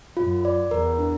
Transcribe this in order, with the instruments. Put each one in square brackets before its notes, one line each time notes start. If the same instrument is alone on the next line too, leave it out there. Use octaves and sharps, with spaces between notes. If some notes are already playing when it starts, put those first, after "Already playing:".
[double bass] F#2 [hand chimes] F4
[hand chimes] D5
[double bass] E2 [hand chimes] A#4
[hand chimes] D4